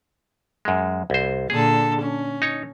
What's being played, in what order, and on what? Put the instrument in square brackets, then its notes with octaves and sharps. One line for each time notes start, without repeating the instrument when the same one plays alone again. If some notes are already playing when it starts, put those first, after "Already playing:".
[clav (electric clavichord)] F#2 G#3
C2 C5
[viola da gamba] A#2 D3 A4 [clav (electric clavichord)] G#4
[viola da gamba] C#4
[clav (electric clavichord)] D#4 C#5